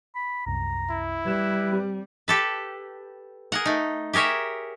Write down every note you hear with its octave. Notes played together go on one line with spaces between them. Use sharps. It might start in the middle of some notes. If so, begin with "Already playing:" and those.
B5
C2 F#2 C3 A#5
E4
G3 B4 G#6 E7
C4 G4
G4 A4 B4
G#4 A#4 F#5
A3 D#4
G4 G#4 A#4 C#5 E5